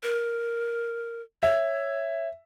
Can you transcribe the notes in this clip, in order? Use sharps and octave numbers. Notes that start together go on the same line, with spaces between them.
A#4
C#5 E5